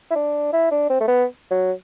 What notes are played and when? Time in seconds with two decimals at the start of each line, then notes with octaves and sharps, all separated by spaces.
0.11 E4
0.15 D4
0.53 E4
0.71 D4
0.90 C4
1.00 A3
1.08 B3
1.51 F#3